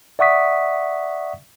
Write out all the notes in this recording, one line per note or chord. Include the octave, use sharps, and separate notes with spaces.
D5 E5 F#5 C#6 D#6 B6